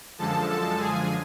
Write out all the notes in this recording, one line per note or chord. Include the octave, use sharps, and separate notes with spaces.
F#2 D3 F3 G#3 A4 A5
A4 A5
G#4 G#5